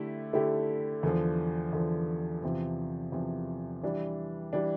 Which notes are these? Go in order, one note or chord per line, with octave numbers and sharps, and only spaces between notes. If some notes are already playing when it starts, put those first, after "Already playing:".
Already playing: D3 A3 E4 G4
D3 A3 E4 G4
E2 D3 F3
E2 D3 F3
E2 C3 F3
E2 C3 F3
E3 G3 D4
E3 G3 D4